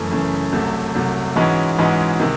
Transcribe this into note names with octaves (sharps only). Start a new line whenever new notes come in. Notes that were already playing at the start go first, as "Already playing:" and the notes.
Already playing: F#2 C#3 E3 A3
F#2 C#3 E3 A3
C2 C3 F#3 A3
C2 C3 F#3 A3
G#2 E3 G#3 C#4 F#4
G#2 E3 G#3 C#4 F#4
C3 D#3 G#3